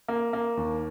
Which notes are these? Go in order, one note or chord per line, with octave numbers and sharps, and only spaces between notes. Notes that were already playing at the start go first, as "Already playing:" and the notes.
A#3
A#3
D#2